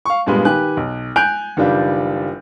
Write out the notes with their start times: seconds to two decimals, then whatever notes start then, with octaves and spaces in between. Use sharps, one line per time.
0.05 F5 C#6
0.26 G2 A#2 G3 G#3 B3
0.45 D#3 G4 B4 G#5 F#6
0.77 B1
1.16 G#5 F#6 G6 D7 F7
1.57 F#1 D#3 G3 D4 F4 B4